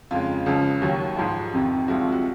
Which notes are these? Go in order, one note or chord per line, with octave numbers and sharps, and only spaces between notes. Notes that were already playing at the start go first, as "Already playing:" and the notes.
F2 C#3 G#3 F4
C#2 C#3 F3
D#2 D#3 F#3 F#4
G#2 F3 G#3
F2 C3 D#3
C2 C3 F3 G#3 F#4
F4
F#4